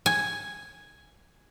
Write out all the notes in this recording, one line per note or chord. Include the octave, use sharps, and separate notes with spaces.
G#5